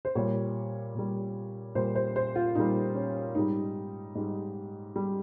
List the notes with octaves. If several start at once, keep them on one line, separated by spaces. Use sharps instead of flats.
C5
A#2 G3 C#5
A#2 G3
A#2 G3 C5
C5
C5
F4
A#2 G3 D#4
C#4
G#2 G3 D#4
G#2 G3
G3